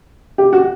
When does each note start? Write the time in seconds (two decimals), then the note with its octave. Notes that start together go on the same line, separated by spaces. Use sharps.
0.38 G4
0.53 F#4